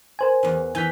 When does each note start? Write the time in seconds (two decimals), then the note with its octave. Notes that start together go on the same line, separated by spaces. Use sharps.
0.19 A#4 C5 G#5
0.43 E2 E3
0.75 E3 G#5 G6 B6